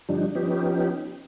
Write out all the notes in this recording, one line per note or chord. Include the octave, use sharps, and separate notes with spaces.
G2 D3 F3 G3 D4 D#4
F3 B3 C#4 D#4 G4